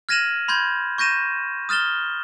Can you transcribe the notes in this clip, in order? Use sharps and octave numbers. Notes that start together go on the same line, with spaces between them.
F6 G#6 A#6 D#7 E7 F#7
B5 C6 G6 G#6
C#6 G6 A#6 D#7 E7
D#6 F6 A6 E7 G7